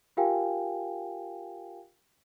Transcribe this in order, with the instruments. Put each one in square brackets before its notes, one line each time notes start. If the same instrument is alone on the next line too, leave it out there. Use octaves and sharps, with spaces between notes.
[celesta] F4 G4 A#4 F5 G5 G#5